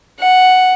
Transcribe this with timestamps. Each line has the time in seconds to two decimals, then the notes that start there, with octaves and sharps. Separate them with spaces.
0.20 F#5